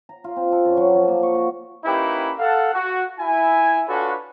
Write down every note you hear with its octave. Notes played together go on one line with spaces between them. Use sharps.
A#5
F4
C4
A4
F#2
F#3
F3
A#3
C#6
F#4
A#3 C#4 D#4 E4 G4 B4
A4 F5 F#5
F#4
E4 G#5
D4 F4 F#4 A4 B4 C#5